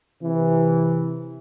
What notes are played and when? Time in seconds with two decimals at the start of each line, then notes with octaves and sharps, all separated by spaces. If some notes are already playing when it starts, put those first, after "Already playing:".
0.22 C3 E3